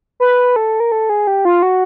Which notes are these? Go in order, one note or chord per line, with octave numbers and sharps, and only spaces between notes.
B4
A4
A#4
A4
G#4
G4
F4
F#4